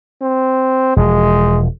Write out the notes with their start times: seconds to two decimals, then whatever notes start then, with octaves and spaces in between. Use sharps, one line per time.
0.22 C4
0.96 E1 F3 G#3